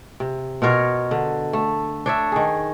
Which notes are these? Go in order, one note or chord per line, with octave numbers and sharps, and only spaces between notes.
C3
B2 F4 A#4 C#5
D3
A3
D4 C#5 E5
D#3 G#4